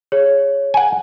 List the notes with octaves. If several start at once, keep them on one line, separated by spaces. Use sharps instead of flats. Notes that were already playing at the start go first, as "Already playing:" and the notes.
G#4 C#5
F#5 G#5